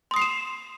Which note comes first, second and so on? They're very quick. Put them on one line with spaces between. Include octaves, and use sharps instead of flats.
C6 D#6 C7 F7 E7